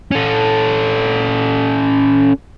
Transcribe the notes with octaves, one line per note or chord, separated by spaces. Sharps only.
C#4 A4